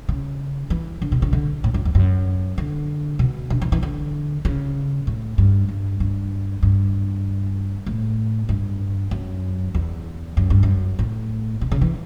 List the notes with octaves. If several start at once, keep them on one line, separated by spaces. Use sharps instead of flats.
C#3
E3
D3
B2
C#3
D3
A2
F#2
E2
F#2
D3
B2
D3
E3
E3
D3
C#3
A2
G2
G2
G2
G2
A2
G2
F#2
E2
F#2
G2
F#2
A2
B2
C#3
E3